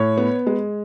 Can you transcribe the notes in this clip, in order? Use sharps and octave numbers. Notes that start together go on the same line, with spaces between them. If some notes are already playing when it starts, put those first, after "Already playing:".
Already playing: A2 C#5
B3
G#3